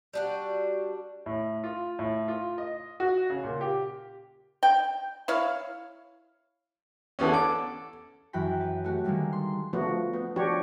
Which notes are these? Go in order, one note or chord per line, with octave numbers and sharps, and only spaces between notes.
G3 D4 F#4
A2
F4
A2
F4
D#5
F#4
C#3
A#2
G4
G5
E4 C#5 F5
D3 E3 B3 C#4
A4 D6
F#2 E3 F#4 G5 B5
B4
A3 F#4 G4
D3 D#3 G3 G#3 A#3
C6
D3 F3 A3 B3 F#4
B3
F3 D4 F#4 G4 C#5